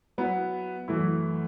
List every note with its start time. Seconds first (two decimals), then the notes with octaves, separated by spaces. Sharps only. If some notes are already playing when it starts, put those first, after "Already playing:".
0.18 F#3 B3 E4 B4
0.88 F#2 E3 A3 E4